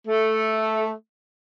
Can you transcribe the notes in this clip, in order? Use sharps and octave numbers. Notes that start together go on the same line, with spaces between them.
A3